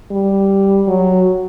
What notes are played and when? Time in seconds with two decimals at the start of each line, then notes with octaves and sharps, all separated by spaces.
0.11 G3
0.88 F#3